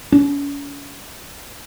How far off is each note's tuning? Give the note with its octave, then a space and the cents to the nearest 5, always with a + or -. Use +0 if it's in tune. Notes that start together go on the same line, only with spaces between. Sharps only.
C#4 +40